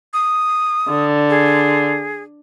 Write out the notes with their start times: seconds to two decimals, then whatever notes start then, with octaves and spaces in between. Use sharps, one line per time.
0.14 D#6
0.89 D3
1.30 G#4